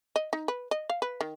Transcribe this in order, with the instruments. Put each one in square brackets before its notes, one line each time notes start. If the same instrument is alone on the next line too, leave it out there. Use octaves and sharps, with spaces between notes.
[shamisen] D#5
D#4
B4
D#5
F5
B4
D#3